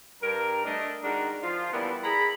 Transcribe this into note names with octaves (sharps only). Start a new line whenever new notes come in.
G2 A#4
A3 D4 D#5
D#3 G#3 D4 D#4 F#4 A#4
F3 F4
E3 G3 A#3 B3 D4 E4
E4 G#4 A#5 B5